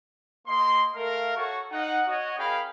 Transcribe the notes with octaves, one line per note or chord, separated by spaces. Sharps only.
A#3 D#5 C6
A3 A#4 F5
F#4 A4 C#5 C#6
D#4 D#5 F5 F#5
F#4 C#5 D#5
C#4 G#4 A#4 F5 G5 B5